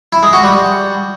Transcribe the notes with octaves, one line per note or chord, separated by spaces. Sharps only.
E4
G#3
F#4
G3